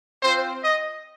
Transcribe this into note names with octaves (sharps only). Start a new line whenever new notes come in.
C4 F4 C5
D#5